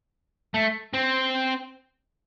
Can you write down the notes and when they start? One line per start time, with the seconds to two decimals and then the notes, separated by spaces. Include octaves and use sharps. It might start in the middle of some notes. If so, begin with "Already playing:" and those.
0.54 A3
0.94 C4